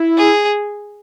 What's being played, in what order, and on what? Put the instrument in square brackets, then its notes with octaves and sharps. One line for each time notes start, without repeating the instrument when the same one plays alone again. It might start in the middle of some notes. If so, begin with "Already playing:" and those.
Already playing: [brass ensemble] E4
[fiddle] G#4